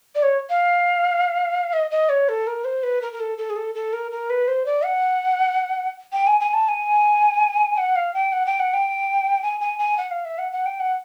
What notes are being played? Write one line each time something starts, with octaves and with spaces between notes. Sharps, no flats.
D5
C#5
F5
D#5
D#5
C#5
A4
A#4
C5
B4
A#4
A#4
A4
A4
G#4
A4
A4
A#4
A#4
B4
C5
D5
F#5
G5
G#5
G#5
A5
G#5
F#5
F5
G5
F#5
G5
F#5
G5
G#5
G#5
G#5
F#5
F5
E5
F#5
F#5
G5
F#5